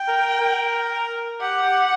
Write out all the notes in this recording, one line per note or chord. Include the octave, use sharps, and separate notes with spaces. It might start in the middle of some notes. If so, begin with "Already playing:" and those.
Already playing: G5
A#4
A#4
G4 F#5
G4